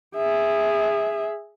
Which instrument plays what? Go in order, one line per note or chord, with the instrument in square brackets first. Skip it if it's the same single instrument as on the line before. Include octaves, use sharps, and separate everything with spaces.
[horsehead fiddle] G#4 E5